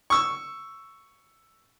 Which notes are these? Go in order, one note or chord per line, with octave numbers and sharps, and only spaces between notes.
C#6 E6